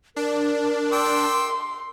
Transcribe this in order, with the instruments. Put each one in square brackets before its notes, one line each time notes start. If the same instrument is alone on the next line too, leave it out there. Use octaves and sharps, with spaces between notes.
[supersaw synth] D4 [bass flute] A#4
[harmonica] G5 D6 E6 [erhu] C6